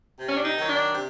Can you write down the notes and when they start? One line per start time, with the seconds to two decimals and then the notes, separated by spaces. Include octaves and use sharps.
0.19 C3
0.29 C#4
0.37 D4
0.44 D#4
0.57 D#3 F#3
0.69 D4
0.94 C3